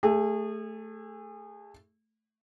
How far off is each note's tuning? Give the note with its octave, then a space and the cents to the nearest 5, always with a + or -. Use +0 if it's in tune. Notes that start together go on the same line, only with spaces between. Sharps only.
A3 +0 G#4 -30